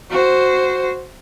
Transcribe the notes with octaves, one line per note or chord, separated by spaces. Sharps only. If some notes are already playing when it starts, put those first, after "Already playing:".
F#4 C5